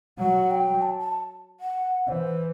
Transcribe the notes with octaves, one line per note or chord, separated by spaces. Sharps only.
F#3 F#5
G5
A5
A5
F#5
E3 C5